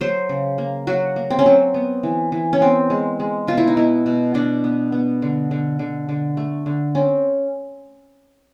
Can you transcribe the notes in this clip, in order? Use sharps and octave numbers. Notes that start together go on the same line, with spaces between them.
F#3 C5
C#3
A#3
F#3 F#4
A#3
C4
C#4
F#3 C4
B3
E3
E3
C#4
B3 C4
G#3
G#3
B2 F4
E4
D#4
B3 E4
B2
B2 D4
B3
B3
D3
D3
D3
D3
A3
D3
C4 C#4